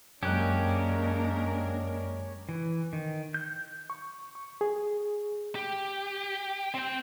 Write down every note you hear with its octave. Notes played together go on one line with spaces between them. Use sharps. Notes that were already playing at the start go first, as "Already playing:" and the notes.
F#2 G#3 A#3 C#4 D4 G4 A#4 F#6
E3
D#3
G6
C#6
C#6
G#4
G4
C4 G5